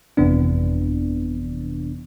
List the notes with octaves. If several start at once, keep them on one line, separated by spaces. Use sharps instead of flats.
G1 F2 C3 E3 B3 D4